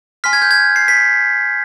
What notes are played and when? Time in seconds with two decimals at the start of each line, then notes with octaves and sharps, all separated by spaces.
0.24 G#5 C6 F6 B6
0.33 G#6
0.42 G6
0.51 G#6
0.76 C7
0.88 B6